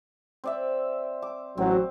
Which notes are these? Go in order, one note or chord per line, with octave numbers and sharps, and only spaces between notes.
C4 D5 E5
D6
A1 F#3 C4